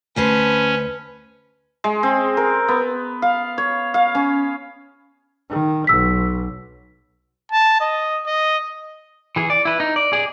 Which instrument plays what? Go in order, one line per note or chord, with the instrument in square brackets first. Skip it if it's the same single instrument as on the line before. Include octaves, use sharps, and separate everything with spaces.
[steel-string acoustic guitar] D2 C5 A5 [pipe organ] C#4 [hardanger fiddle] B4
[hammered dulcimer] G#3
C4
A#4
B3
F5
C#5
F5
C#4
[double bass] D#3
[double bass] B1 [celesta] E6 B6
[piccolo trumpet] A5
D#5
D#5
[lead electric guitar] E3 G#4
D5
E4 B4
D#4
D5
G#4 D5